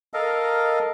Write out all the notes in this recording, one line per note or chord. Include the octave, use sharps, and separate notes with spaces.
A4 A#4 D#5 F5